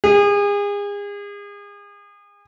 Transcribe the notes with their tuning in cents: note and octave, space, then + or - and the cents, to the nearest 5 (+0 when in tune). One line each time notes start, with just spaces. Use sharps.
G#4 -35